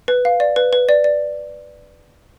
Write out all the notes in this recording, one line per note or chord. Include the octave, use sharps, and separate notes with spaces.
B4
F5
D5
B4
B4
D5
D5